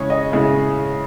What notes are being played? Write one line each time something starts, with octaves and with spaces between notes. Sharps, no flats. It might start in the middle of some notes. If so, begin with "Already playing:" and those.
Already playing: C#3 G#3 C#4 E4 C#5
D#5
C#3 G#3 C#4 E4